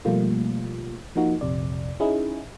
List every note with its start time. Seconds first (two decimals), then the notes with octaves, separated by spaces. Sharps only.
0.05 B2 F3 G3 A3 A#3 F4
1.16 F3 A#3 D#4 F#4
1.41 A#1 F2 C3 D5
2.00 C#4 D#4 E4 G#4